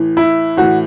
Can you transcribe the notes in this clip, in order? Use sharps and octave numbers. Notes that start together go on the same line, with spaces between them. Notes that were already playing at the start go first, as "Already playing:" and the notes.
Already playing: A2 E3
E4
A2 E3 F#4